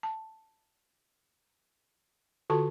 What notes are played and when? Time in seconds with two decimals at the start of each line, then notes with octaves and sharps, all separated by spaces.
0.03 A5
2.50 D3 F4 F#4 A4 A5 C#6